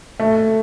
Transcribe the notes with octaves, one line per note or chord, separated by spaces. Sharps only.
A3